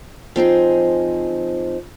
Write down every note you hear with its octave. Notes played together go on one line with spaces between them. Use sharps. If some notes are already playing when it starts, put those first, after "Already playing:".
F3 C4 D#4 G#4